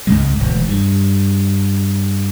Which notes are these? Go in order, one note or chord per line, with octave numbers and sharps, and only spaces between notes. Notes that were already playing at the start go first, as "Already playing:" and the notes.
C#2 G#2 C#3 G#3
E1 D2
G2